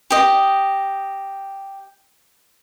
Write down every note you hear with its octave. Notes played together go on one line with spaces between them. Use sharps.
G4 D#5